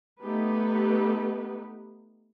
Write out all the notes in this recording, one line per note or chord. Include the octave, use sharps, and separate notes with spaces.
A3 B3 D#4 G4 B4